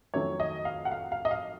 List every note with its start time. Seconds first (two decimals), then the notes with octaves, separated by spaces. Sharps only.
0.14 F2 D#3 F#3 A3 C#5
0.40 D#5
0.65 F5
0.85 F#5
0.91 F5
1.12 F5
1.25 D#5
1.31 F5